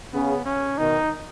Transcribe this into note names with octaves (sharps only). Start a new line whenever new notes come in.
C#3 B3
C#4
B2 D#3 D#4